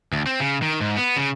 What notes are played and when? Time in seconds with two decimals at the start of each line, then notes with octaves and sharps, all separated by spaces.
0.13 D2
0.27 C4
0.40 C#3
0.62 D#3
0.81 G#2
0.97 B3
1.16 C#3